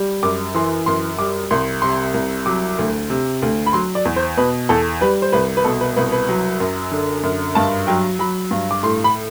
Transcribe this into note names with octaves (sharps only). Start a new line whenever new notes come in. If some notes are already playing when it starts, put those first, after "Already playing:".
Already playing: G3
F#2 D6
E3 C6
F#2 C6
G3 D6
C2 C6
C3 C6
C2
F#3 D6
D2
C3
D2
B5
F#3 C6
D5
E2
C5
B2 B4
E2 A4
G3 B4
C5
C2 B4
B4
B2 A4
B4
C2 B4
B4
F#3
F#2
D3
F#2
G2 A5
F#3 G5
F#3 B5
G2
D6
A2 C6
B5